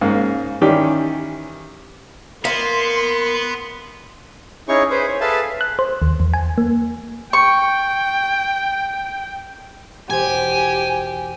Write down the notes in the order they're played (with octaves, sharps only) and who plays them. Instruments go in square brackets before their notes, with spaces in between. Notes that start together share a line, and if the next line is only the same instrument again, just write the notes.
[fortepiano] G#2 C#3 A#3
D#3 E3 C#4 G4 D5
[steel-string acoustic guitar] A#3 [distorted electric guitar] B3 [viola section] C6
[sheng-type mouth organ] C#4 D#4 E4 G#4 C#5 C#6
G#4 B4 C5
C#5
G#4 A4 B4 E5 F5 A5
[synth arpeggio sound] F#6
C5
D#2
E2
G#5
A#3
[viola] G5 [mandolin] C#6
[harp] E1 C5 [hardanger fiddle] G4 [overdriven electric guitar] G#5